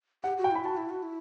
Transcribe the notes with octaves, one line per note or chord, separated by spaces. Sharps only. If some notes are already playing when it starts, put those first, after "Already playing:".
G4 F#5
F#4
G5
E4 B5
F#4 A5
E4
F#4
E4